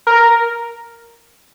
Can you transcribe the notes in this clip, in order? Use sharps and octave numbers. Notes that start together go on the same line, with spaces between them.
A#4